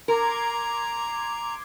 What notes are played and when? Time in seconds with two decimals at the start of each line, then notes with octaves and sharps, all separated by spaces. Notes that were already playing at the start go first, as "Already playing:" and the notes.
0.08 A#4 A#5 C6 D6 G#6